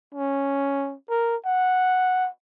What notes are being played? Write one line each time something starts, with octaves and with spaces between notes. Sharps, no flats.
C#4
A#4
F#5